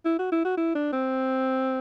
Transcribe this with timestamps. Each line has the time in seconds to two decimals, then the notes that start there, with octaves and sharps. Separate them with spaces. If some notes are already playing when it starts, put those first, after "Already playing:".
0.05 E4
0.19 F#4
0.32 E4
0.45 F#4
0.57 E4
0.75 D4
0.93 C4